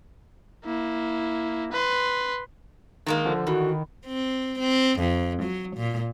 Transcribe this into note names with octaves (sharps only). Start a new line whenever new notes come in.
A#3 E4
B4 C6
D#3 G#3 A#3
D3 F3
D#3 E3 F#4
C4
C4
F2
F#3
A#2